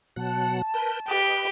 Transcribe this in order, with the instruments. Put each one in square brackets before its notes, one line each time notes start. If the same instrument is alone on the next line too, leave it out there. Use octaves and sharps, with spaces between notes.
[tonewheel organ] B2 F#3 F#5 [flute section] A5
[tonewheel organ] A#4 B4 G6
[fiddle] G4 [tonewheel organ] B4 D#5 B5